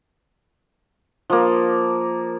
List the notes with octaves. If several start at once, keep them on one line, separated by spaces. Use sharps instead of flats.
F3 A#3